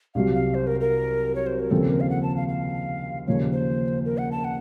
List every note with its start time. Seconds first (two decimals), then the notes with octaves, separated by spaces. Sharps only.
0.15 C2 C3 F#3 F5
0.34 F5
0.54 C5
0.67 A#4
0.80 A#4
1.35 C#5
1.46 C5
1.60 A#4
1.70 D#2 C#3 F3 C4 A4
1.90 A#4
2.00 F5
2.10 F#5
2.23 A5
2.36 F5
2.48 F5
3.27 D#2 C#3 F3 A#3 C#5
3.53 C5
4.05 A#4
4.18 F#5
4.32 A5
4.44 F#5